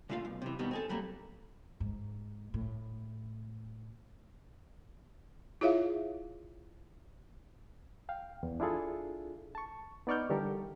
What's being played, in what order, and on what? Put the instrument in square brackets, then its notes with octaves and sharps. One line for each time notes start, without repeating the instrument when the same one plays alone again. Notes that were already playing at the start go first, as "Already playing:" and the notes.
[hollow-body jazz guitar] A#2 D3 A3 F4 F5
B1
C3 E3
B2 D#3 G3 B3
C4 G#4 A4
F#3 G3 A3 A#3
[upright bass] G#2
A2
[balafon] E4 F4 G#4 C#5 E5 F5
[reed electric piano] F5 G5
E2
D4 E4 F4 G#4 A4
A5 C#6
B3 D#4 D5 C#6 F6 G6
D3 E3 G3 G4 A4 A#4